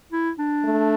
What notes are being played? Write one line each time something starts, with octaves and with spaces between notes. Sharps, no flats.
E4
D4
A3